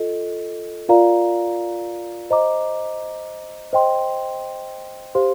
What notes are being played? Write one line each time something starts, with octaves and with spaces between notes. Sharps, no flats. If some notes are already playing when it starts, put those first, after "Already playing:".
Already playing: F4 A4 D#5
F4 A#4 D5 F5 A#5
C5 D#5 A#5 D6
C5 D#5 G5 C6
G4 C5 F5 C6